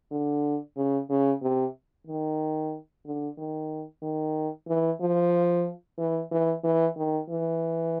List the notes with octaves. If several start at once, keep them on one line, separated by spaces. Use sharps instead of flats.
D3
C#3
C#3
C3
D#3
D3
D#3
D#3
E3
F3
E3
E3
E3
D#3
E3